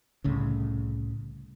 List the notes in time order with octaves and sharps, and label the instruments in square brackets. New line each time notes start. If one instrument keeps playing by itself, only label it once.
[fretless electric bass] C2 A2 C#3